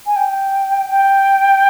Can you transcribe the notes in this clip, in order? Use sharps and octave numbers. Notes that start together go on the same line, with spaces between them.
G#5
G5
G5